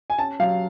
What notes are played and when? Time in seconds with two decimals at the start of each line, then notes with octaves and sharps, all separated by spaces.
0.10 G#5
0.19 C#4 A5
0.40 F#3 F5